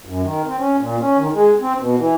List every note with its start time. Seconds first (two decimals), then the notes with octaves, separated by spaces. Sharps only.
0.05 F#2
0.22 D#3
0.46 C4
0.59 C#4
0.77 A#2
1.00 C#4
1.18 D#3
1.34 G#3
1.61 C4
1.80 B2
1.98 E3